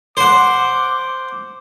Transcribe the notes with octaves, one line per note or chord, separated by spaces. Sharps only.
C5 F#5 D6